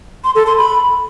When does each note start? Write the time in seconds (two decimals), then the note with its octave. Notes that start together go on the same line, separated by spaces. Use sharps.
0.24 C6
0.35 A4
0.46 C6
0.57 B5